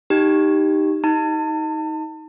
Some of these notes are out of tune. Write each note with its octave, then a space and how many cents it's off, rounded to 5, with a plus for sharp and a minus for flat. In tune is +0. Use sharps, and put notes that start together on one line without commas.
D#4 +0 G4 +0
D#4 +20 A5 +35